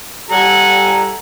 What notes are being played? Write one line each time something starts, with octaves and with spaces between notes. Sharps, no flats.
G3 A4 F#5 G#5 A#5